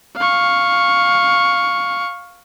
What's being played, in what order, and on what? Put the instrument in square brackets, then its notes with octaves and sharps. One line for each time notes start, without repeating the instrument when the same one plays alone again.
[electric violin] F5 C#6